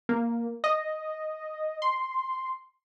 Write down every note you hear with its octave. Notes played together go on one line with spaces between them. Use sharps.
A#3
D#5
C6